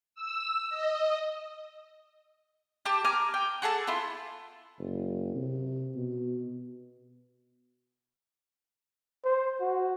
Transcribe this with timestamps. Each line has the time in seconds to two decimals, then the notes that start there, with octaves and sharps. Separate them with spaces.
0.15 E6
0.69 D#5
2.86 G4 A5
3.04 G#5 A#5 D6 F6
3.34 G5
3.62 F#4 G#4 A4 A5
3.87 E4 F4
4.78 F#1
5.35 C3
5.96 B2
9.24 C5
9.61 F#4